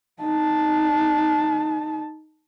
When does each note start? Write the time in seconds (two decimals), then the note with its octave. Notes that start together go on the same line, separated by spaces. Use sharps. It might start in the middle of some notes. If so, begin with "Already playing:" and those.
0.21 D#4 A5